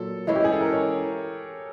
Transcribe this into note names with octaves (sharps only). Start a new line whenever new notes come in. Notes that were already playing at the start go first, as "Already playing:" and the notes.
Already playing: A#2 F#3 A4
E3 G#3 C#4 E4
G4
G#4
A4
A#4
C#5